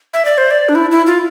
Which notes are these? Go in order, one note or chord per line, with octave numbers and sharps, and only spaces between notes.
E5
D5
C5
D5
D4
E4
E4
F4